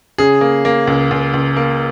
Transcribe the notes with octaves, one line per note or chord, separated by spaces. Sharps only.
C#3 G#4
A#3
A#3
C#2
C#2
C#2
A#3